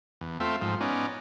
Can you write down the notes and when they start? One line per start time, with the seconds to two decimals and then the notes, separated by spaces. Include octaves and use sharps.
0.21 E2
0.40 A3 C4 F4 E5
0.61 G#2 F3
0.81 B3 C#4 D#4 D5